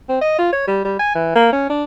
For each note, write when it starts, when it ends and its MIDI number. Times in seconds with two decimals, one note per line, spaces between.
0.09 0.21 60
0.21 0.38 75
0.39 0.53 65
0.53 0.63 73
0.67 0.81 55
0.85 0.96 55
0.99 1.15 80
1.15 1.32 52
1.36 1.51 58
1.53 1.67 61
1.70 1.84 62